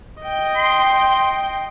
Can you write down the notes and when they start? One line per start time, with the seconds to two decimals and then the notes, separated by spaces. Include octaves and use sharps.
0.22 D#5 G5
0.56 C6